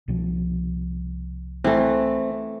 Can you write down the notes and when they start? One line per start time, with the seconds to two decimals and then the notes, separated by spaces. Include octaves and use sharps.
0.08 C2 B2 F3
1.64 E3 A3 C4